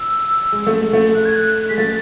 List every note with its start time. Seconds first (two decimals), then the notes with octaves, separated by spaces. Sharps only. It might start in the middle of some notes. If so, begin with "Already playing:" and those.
Already playing: E6
0.52 G#3
0.67 A3
0.73 G#3
0.93 A3
1.15 F#6
1.25 G#6
1.36 F#6
1.69 G#3 B6
1.78 A3 A6